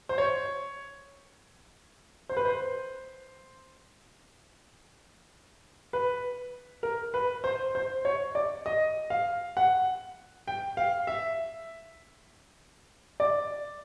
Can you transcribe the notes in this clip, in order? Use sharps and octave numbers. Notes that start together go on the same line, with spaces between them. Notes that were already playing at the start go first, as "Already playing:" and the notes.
C5
C#5
C5
B4
C5
B4
A#4
B4
C5
C5
C#5
D5
D#5
F5
F#5
G5
F5
E5
D5